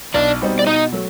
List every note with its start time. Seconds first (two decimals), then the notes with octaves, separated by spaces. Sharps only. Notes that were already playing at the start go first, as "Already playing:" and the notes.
0.14 B1 D4 D5
0.41 B2 G3 C4 D#4
0.59 D5
0.66 B2 D#4 D#5
0.92 F#3 A3